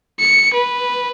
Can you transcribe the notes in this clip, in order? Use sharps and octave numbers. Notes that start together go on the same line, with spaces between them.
C#7
B4